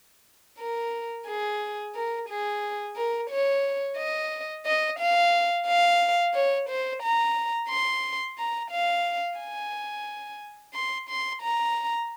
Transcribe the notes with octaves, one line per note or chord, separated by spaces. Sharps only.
A#4
G#4
A#4
G#4
A#4
C#5
D#5
D#5
F5
F5
C#5
C5
A#5
C6
A#5
F5
G#5
C6
C6
A#5